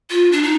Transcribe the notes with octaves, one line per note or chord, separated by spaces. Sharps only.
F4
D4
D#4